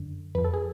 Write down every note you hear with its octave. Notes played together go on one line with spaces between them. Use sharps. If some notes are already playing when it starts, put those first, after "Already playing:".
Already playing: F#2 D3
F2 F3 B4
A4
G#4